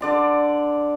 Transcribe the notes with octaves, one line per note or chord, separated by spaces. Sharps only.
D3 D5 C6